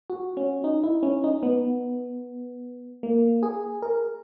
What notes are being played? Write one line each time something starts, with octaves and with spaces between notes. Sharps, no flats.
F#4
C#4
D#4
E4
C#4
D#4
B3
A#3
G#4
A#4